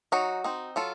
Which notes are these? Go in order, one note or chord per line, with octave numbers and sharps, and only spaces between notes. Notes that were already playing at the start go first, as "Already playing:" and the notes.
F#3 D#4 F#4
C4 D#4
F#3 F4 A4